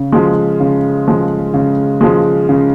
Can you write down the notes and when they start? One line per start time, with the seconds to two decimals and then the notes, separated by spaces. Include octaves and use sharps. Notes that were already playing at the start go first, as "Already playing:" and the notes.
Already playing: C#3
0.12 F3 G#3
0.60 C#3
1.07 F3 G#3
1.54 C#3
2.01 F3 G#3
2.49 C#3